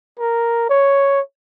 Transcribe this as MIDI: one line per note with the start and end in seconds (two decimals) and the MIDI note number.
0.19 0.65 70
0.69 1.21 73